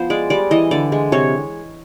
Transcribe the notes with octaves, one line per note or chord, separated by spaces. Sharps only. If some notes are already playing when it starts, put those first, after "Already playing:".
Already playing: F3 B3 C5
G#3 D5
G3 D5
E3 D#5
D3 D5
G#3
C3 C#5